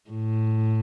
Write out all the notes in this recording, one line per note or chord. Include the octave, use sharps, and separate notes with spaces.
A2